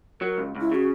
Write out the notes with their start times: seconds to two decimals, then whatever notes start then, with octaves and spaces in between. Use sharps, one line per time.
0.21 F#3 A#4
0.38 C#2
0.55 C#2
0.61 E4
0.71 C#3 F#4